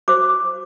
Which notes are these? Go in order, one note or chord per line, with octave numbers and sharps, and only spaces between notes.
F#4 C5 D6